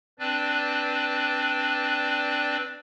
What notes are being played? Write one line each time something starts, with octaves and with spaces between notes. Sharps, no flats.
C4 D4 B4 D5